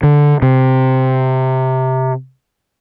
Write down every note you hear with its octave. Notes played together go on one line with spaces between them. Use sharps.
D3
C3